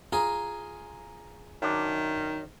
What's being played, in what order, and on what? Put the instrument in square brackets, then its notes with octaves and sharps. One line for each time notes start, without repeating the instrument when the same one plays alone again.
[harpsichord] F4 G#4 [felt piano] A#5
[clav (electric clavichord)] F#2 D4 [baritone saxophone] D#3